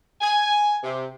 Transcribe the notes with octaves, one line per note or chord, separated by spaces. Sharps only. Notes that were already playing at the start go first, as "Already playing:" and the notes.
G#5
C3